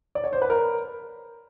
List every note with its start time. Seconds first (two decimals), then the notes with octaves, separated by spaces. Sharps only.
0.15 D5
0.24 C#5
0.33 C5
0.42 B4
0.50 A#4